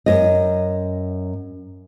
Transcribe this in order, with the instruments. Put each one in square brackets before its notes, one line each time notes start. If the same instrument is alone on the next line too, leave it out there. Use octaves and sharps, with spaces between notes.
[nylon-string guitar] F#2 D#5